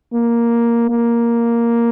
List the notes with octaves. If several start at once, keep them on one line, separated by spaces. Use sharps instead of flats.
A#3
A#3